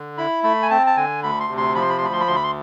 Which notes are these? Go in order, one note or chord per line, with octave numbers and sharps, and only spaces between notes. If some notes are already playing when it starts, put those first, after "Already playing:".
Already playing: D3
E4 B5
A3 B5
G#5
C4 A5
A5
D3 G#5
D2 B5
C6
C3
C6
F3 B5
C6
B5
C6
D2 B5
C6
B5
D2 C6
B5
C6